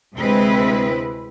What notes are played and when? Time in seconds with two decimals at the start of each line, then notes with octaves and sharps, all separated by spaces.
0.16 D2 C3 G#3 C4 E4 B4